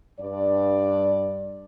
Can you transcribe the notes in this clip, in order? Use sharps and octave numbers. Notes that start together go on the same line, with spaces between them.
G2 D5